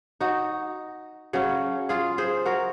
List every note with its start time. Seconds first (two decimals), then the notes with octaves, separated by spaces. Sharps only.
0.21 D#4 F#4
1.33 C#3 F#3 C#4
1.89 F4 G#4
2.18 G#4 C5
2.45 F#4 A#4